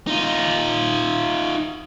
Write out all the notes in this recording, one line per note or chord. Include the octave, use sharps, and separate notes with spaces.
D#4 F4